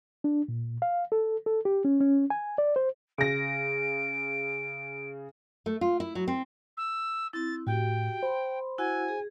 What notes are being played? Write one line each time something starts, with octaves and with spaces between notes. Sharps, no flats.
D4
A#2
F5
A4
A4
G4
C#4
C#4
G#5
D5
C5
C#3 A#6 D7
A3
F4
E4
F#3
C4
E6
C4 E4 A6
A2 F#4 G4 G5
C5 B5 C6
E4 F#4 F#5 G#5
G#4